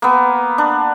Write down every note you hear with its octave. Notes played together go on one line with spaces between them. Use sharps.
A#3 B3
D4